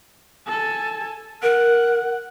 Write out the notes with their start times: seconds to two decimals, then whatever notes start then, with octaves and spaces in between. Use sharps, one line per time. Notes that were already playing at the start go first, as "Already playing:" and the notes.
0.48 A4 G#5
1.43 A#4 F#5